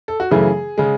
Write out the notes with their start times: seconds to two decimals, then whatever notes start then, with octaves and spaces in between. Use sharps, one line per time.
0.08 A4
0.20 F#4
0.31 F#2 C#3 E3 A3 G#4
0.78 C#3 G#3